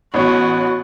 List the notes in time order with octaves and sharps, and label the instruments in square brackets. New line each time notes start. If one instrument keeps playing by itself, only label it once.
[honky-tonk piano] A1 B3 C#5 [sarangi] F#4